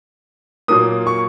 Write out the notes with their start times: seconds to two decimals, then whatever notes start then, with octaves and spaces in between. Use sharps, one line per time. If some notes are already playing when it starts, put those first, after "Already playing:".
0.68 A#2 F#3 A#3 D#6
1.07 C#6